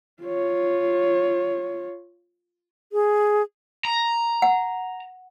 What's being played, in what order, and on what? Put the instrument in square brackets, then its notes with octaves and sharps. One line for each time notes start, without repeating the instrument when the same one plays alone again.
[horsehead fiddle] F4 C#5
[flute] G#4
[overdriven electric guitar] A#5
[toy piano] F#5